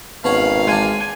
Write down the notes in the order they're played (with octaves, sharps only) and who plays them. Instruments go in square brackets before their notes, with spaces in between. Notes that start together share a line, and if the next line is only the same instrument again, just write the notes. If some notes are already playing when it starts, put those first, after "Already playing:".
[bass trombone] G#1 [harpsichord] B2 C#4 F#5 [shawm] F5
[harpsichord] G#3 D4 [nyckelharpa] G#5